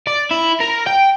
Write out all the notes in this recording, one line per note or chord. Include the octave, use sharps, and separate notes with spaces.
D5
E4
A#4
G5